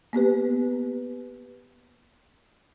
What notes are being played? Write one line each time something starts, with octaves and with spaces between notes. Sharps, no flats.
A#3 B3 G4 B4